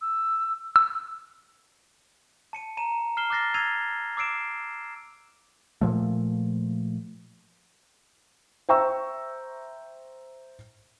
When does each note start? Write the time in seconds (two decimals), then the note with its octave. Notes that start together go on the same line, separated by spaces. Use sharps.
0.01 E6
0.76 E6
2.53 A5 C#7 D#7
2.77 A#5 D#7 E7
3.17 F6 C7 E7 G7
3.30 D6 F6 F#6 A6 A#6 C7
3.54 E6 G#6 A6 C7 D#7 F7
4.17 D6 E6 C7 D7 E7
5.81 A#2 F3 A3
8.69 C5 E5 G5 A#5 C#6 E6